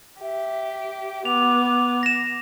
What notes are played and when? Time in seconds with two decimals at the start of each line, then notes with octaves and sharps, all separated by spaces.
0.21 G4 E5
1.25 B3 D6 F7
2.03 A#6 E7